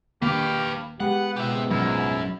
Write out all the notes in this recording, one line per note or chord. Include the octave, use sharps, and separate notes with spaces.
D#1 D#3 A#3 G4 B4 F5
G#3 B3 G4 F#5
C#2 G#2 B2 G4 E5
A1 F#2 F#3 E4